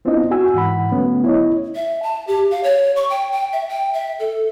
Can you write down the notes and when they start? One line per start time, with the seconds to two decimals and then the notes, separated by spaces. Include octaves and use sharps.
0.05 B3 C4 D4 E4 F4 D#5
0.31 F#4 G#5 E6
0.54 G#2 E3 F#5 B5
0.91 D3 F#3 A3 B3 C#4
1.24 E4 C#5 D#5
1.76 E5
2.03 A5
2.28 G4
2.51 F5
2.64 C#5
2.96 C#6
3.10 G5
3.32 G5
3.53 E5
3.69 G5
3.94 E5
4.19 A4